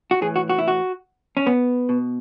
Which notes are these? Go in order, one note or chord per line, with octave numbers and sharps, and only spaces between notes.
F#4
A2 E3 G#4
F#4
F#4
E4
F#4
C#4
B3
B2